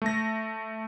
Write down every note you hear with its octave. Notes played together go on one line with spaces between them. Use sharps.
A3 A#6